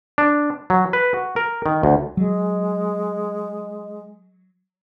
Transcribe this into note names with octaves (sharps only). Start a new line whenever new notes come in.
D4
F#3
B4
F#4
A#4
D#3
D2
F#3 G#3